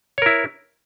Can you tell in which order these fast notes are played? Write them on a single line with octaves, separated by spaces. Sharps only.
C#5 A#4 E4